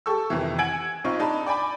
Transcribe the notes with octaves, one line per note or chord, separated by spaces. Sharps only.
G4 A4 C#6 E6
F2 C3 D#3 E3
F#5 G#5 E6 G#6 D7 F#7
B1 C4 D#4 F4 C#6
D4 D#4 A5 B5
D5 G5 G#5 B5 D6